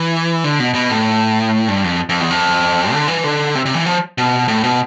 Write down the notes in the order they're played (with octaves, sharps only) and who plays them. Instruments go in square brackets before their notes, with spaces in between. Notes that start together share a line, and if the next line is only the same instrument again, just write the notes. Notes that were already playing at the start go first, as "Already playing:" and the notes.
Already playing: [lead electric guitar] E3
D3
B2
B2
A2
G2
F2
F2
E2
F2
D3
E3
D3
C3
C3
E3
F3
B2
A2
B2